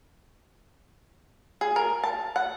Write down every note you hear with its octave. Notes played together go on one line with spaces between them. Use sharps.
G#4
A#4
A5
F#5